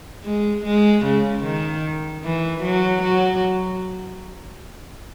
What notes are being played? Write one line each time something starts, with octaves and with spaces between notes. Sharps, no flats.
G#3
G#3
C#3
D#3
E3
F#3
F#3